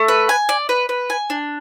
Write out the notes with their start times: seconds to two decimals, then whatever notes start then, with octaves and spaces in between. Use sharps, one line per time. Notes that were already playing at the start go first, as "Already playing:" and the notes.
Already playing: A3
0.08 B4
0.29 G#5
0.49 D5
0.69 B4
0.89 B4
1.10 G#5
1.30 D4